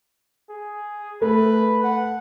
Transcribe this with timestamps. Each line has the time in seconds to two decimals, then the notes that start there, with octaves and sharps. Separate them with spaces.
0.50 G#4
1.22 A3 B4
1.84 F#5